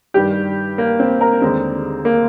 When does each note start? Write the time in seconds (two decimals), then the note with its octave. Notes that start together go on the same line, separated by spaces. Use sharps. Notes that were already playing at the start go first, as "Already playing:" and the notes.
0.14 G2 D#3 G3 G4
0.78 A#3
0.99 C4
1.21 A#4
1.42 D#2 D3 G#3 C4
2.05 A#3